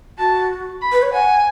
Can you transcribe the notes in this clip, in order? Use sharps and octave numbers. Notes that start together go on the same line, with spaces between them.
F#4 A5
B5
B4
C#5
F#5 G#5